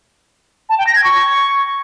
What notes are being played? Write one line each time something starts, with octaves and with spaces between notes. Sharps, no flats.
A5
G5
A#6
G#6
C#6